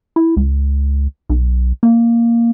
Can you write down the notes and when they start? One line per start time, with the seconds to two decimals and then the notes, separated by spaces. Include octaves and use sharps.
0.16 E4
0.37 C#2
1.29 B1
1.83 A#3